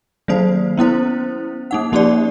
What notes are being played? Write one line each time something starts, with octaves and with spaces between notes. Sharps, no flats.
D#3 F#3 A#3 C5
B3 C#4 E4 C5
A#3 D#4 F#5
F3 A#3 C#4 D#4 G4 D5